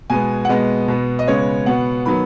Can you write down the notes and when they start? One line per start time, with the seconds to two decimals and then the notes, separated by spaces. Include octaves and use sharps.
0.10 B2 G#3 B3 G#5
0.45 F#5
0.49 B2 G#3 B3 D#5
0.88 B2 B3
1.19 D#5
1.27 C#3 G#3 B3 C#5
1.66 B2 B3 F#5
2.06 D#3 F#3 B3 B5